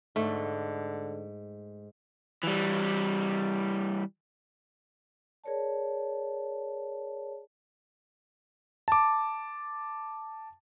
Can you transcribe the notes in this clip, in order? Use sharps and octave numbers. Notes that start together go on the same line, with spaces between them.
G#2 D3 A3
E3 G3
G#4 A#4 C#5 D5 A5
A5 D6